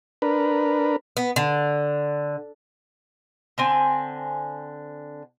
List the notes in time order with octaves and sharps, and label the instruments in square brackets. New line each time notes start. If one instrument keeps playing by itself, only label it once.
[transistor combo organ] D4 A#4 B4
[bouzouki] B3
D3
D3 C4 G#5